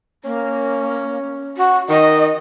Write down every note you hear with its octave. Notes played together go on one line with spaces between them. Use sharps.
A#3 C#4
F#4
D#3 D#5